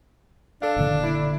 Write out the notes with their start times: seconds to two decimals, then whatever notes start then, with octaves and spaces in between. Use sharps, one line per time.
0.62 D4 A4 F5
0.76 F#1 A#2 D3
1.03 E4